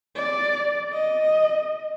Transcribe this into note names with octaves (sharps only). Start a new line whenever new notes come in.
D5
D#5